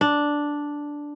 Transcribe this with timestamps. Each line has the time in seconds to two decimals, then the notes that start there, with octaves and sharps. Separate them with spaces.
0.01 D4